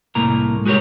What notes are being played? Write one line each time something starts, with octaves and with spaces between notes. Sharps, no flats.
C2 A2 A#3 A#5
G#3 F#4 G4 A#4 C#5